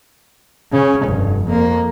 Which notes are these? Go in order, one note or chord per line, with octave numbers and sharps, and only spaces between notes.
C#3 C#4
F1 G2
F2 A#3